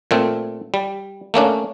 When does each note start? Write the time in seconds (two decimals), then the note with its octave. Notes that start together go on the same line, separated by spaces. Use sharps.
0.11 A#2 A3 C4
0.74 G3
1.34 A3 A#3 C#4 D4